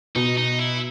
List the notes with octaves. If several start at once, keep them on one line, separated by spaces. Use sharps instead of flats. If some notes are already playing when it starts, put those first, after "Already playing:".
B2 D#4
D#4
E4